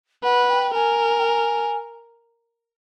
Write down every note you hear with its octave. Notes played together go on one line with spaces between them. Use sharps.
B4 F#5
G5
A#4 G#5
G5
G#5